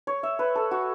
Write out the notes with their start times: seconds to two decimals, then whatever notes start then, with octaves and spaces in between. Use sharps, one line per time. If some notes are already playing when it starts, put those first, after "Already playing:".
0.07 C#5
0.23 E5
0.39 B4
0.55 A4
0.71 F#4